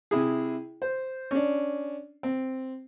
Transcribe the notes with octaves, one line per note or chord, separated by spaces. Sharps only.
C3 E4 G#4
C5
C#4 D4
C4